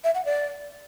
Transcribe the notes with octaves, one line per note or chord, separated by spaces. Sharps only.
E5
F#5
D5